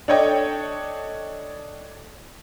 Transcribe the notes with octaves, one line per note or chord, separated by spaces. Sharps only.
D4 A4 C#5 D#5 G5